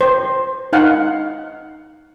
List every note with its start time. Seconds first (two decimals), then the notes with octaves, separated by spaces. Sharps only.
0.01 C5
0.73 D#4 F5 F#5